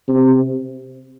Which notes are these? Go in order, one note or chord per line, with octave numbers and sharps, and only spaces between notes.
C3